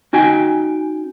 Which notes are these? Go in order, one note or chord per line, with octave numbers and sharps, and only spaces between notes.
C#4 D#4 F#4 G5 G#5